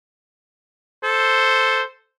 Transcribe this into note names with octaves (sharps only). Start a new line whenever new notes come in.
A4 C5